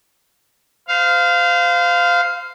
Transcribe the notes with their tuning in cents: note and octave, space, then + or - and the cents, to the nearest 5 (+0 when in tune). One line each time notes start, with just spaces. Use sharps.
C5 -35 F5 +0